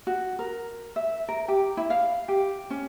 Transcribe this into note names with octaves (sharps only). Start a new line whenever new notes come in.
F#4
A#4
E5
A#4
G4
E4
F5
G4
C#4